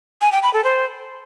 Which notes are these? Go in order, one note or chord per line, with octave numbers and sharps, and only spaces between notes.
G#5
G5
B5
A4
C5